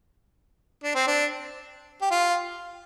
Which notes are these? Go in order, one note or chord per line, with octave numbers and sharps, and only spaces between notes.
D4
C4
D4
G4
F4